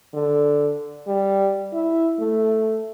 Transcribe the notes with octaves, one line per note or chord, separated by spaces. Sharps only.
D3
G3
E4
A3